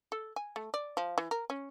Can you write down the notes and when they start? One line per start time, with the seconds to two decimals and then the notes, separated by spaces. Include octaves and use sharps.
0.12 A4
0.36 G#5
0.56 A3
0.74 D5
0.97 F3
1.18 E3
1.31 A#4
1.50 C#4